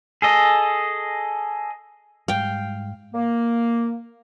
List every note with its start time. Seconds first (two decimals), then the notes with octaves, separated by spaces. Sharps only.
0.22 G#4 A4 D#5
2.28 G#2 G3 F5 G5
3.14 A#3